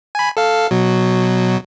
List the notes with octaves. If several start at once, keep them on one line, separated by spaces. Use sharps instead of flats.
G#5 B5
A4 F5
B2 F#3